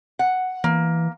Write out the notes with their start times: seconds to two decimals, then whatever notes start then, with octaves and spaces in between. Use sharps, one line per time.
0.19 F#5
0.64 E3 A#3